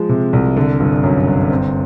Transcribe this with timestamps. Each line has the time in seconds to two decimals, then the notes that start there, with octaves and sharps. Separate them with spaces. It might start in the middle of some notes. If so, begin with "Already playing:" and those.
Already playing: F3 G#3
0.09 C3
0.33 C2
0.57 D3
0.80 G1
1.03 F#2
1.27 G1
1.51 C4